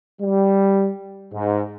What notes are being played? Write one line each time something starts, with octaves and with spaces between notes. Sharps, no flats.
G3
G#2